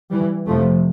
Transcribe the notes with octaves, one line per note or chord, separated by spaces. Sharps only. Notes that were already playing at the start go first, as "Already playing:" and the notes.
E3 G3
F1 F2 C3 F3 A3